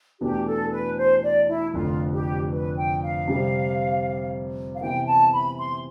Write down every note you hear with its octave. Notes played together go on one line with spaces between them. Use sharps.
E2 B2 A3 D4 G4
A4
B4
C5
D5
E4
F1 F2 D3 F4
G4
B4
G5
F5
C3 G3 C4 G4
F5
C3 E3 B3 G5
A5
B5
C6